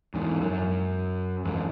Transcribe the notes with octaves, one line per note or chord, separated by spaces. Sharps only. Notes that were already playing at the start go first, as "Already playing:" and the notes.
E2 G#2
F#2
E2 G#2